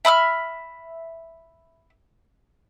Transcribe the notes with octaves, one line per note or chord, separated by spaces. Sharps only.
E5 B5 D#6 F6